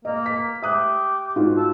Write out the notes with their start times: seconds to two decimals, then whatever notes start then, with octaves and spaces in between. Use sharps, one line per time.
0.05 A#3 D#5
0.26 B6
0.63 G4 E5 D#6 F#6
1.36 G#2 F4 F#4
1.56 A4